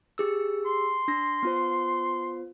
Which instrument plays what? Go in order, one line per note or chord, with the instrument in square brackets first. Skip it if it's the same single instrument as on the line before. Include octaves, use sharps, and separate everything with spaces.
[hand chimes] G4 G#4 E6
[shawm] C6
[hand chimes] D4 A#6
B3 F4 C5